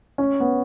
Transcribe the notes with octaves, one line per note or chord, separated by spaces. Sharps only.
C#4
B3